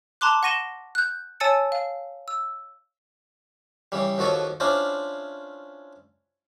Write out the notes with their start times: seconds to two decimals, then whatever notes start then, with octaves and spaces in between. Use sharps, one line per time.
0.21 A5 A#5 C6 D6 F#6
0.43 F#5 C#6 A#6 D#7 E7 G7
0.95 F#6 G6
1.40 C#5 G#5 A5 E6 A6 C#7
1.72 F5
2.28 E6
3.92 C#3 E3 G3
4.18 D#2 F3 F#4 A4 C#5
4.60 C#4 D4 E4 F4 C5